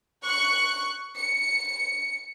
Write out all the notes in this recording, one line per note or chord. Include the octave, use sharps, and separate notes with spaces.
C#6 F#6 C#7
C#7